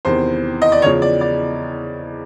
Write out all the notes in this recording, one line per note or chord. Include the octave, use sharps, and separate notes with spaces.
E2 C3 D#3 C5
D#5
D5
E2 C#3 F3 C#5
D5
D5